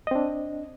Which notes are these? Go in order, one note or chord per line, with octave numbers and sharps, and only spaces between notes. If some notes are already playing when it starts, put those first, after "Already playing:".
C4 D4 D#5